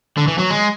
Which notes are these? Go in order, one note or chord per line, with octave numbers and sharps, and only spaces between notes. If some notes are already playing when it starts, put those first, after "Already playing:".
D3
E3
F#3
G#3